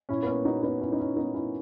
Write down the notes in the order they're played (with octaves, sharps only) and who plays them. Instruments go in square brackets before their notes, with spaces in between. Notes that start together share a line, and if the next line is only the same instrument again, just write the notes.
[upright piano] A#2 C#4 E4
B3
A#3 C#4
D#4 F#4
B3 D#4
C#4 E4
D#4
C#4 E4
B3 D#4
C#4 E4